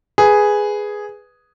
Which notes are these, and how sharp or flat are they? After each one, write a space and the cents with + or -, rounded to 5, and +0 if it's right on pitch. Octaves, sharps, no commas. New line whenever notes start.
G#4 +0 B4 +0